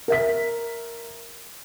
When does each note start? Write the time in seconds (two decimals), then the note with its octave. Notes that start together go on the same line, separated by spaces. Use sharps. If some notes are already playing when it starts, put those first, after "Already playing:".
0.08 A#4 E5 B6